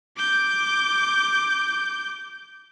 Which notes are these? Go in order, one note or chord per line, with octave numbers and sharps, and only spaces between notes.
D6 G6